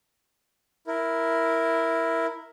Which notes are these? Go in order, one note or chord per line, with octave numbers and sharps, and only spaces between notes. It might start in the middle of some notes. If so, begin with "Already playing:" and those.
E4 A#4